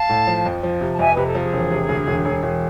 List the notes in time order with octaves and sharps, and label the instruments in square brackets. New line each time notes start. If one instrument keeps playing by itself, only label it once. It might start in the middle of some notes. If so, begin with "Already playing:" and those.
Already playing: [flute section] F5 A5
[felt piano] A2
F3
F2
F3
C3
[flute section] A5
[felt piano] F2 [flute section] E5 G#5
[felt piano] C3 [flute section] B4
[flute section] A4
[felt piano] F3 [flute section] G#4
[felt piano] E1
C3
D2
E1
E1
E1